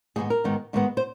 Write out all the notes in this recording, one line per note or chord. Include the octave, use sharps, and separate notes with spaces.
G#2 D#3 G#3 B3 G#4
A#4
G#2 D#3 G#3 B3
G#2 D#3 G#3 B3
C5